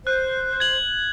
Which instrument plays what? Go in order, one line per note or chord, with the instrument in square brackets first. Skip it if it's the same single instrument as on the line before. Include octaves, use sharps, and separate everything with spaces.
[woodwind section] C5 [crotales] F#6
[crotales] G#6 F#7